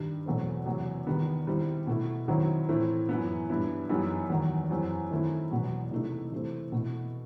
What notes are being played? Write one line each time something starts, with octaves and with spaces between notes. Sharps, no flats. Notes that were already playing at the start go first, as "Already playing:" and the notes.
Already playing: G2 D#3 G3
E2 B2 F#3 A3 C4
E2 C3 F#3
E2 D#3 G3 B3
D#3 G3 C4 E4
B2 A3 E4
D#3 F#3 C4 E4
A2 E3 A3 C4
F#2 E3 B3
G2 E3 B3 E4
F#2 E3 G3 B3 D#4
E2 D#3 F#3
F#2 E3 G3 C4
D#3 A3 C4 E4
E2 B2 F#3 B3
C3 E3 A3 D#4
C3 E3 A3 C4
B2 A3 E4